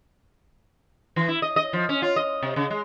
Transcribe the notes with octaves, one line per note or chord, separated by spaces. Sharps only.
E3
E4
D#5
D#5
F3
C#4
F4
D#5
C3
C#3
G#3